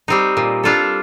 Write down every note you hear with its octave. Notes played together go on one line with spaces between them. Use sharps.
G3 C4 D#4
A#2
G3 D4 F4 A4